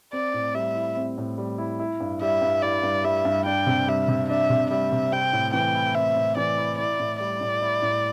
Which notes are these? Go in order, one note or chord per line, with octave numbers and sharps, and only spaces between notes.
C4 D5
A2
G3 E5
E4
C4
A2
G3
E4
E4
G2
G3 E5
G2
E4 D5
G2
G3 E5
G2
D4 G5
C3
G3 E5
C3
D4 E5
C3
G3 E5
C3
C4 G5
A2
E3 G5
E4
C4 E5
A2
E3 D5
E4
E4 D5
A2
G3 D5
A2
E4
A2